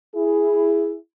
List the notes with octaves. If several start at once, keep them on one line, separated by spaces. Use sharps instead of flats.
E4 G#4